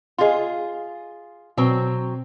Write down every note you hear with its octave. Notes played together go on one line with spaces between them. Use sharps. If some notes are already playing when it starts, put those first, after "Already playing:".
F4 G#4 D#5 C6
B2 F#3 C4